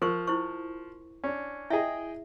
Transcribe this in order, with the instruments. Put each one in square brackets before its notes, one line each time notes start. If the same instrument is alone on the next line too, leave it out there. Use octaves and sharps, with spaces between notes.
[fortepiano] F3 [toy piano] A#4 C5 C#6
[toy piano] E4 C5 C#6
[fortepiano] C#4 D4
[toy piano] E4 E5 [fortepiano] G#4 D#5 G5